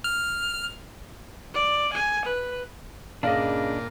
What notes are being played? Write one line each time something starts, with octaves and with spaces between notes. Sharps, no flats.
F6
D5
G#5
B4
G1 A#2 C#3 D4 D5 D#5 F5